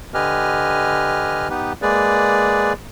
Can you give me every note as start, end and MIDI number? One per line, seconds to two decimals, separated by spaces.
0.14 1.48 50
0.14 1.48 67
0.14 1.48 71
0.14 1.48 75
0.14 1.48 80
0.14 1.48 89
1.50 1.73 59
1.50 1.73 63
1.50 1.73 67
1.50 1.73 71
1.82 2.73 56
1.82 2.73 58
1.82 2.73 68
1.82 2.73 71
1.82 2.73 74